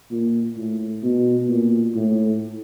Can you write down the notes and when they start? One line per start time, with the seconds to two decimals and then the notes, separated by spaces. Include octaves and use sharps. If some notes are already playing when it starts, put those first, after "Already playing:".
0.11 A#2
0.56 A2
1.03 B2
1.48 A#2
1.95 A2